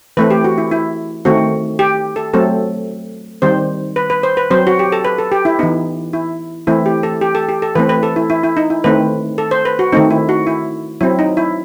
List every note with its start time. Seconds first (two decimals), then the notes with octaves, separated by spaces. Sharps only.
0.17 E3 A3 C4 B4
0.31 G4
0.44 F#4
0.58 E4
0.71 E4
1.25 D#3 A3 C4 F#4
1.79 G4
2.16 A4
2.34 F#3 A3 C4 A4
3.42 D#3 G3 C4 C5
3.96 B4
4.10 B4
4.23 C5
4.37 B4
4.50 F#3 C4 C5
4.67 F#4
4.79 G4
4.92 A4
5.05 B4
5.18 A4
5.32 G4
5.45 E4
5.59 E3 B3 D#4
6.13 E4
6.67 E3 A3 C4 E4
6.86 G4
7.03 A4
7.21 G4
7.35 A4
7.49 G4
7.62 A4
7.75 E3 A3 C4 B4
7.89 B4
8.03 A4
8.16 E4
8.30 E4
8.43 E4
8.57 D#4
8.70 E4
8.84 D#3 A3 C4 B4
9.38 A4
9.51 C5
9.65 B4
9.79 F#4
9.92 D#3 A3 C4 D#4
10.11 E4
10.29 F#4
10.47 E4
11.01 F#3 C4 E4
11.19 D#4
11.37 E4